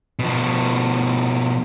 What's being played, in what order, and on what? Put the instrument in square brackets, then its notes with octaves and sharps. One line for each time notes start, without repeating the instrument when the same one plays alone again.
[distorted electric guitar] B2 F3